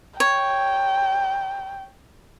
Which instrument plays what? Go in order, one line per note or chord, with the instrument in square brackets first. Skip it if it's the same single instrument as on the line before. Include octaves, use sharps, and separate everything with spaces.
[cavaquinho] C#5 [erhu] G5